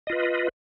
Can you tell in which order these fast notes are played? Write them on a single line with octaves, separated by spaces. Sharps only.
D#5 F4 B4